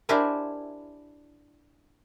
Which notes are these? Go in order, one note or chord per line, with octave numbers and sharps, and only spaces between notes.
D4 E4 G4 A#4 C5 G#5